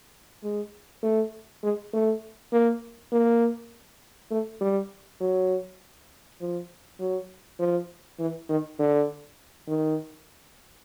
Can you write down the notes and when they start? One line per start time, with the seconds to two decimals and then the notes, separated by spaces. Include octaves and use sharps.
0.43 G#3
1.03 A3
1.63 G#3
1.93 A3
2.52 A#3
3.12 A#3
4.31 A3
4.61 G3
5.21 F#3
6.41 F3
6.99 F#3
7.59 F3
8.19 E3
8.49 D#3
8.79 D3
9.68 D#3